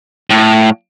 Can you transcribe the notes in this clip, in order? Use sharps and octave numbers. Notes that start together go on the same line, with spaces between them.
A2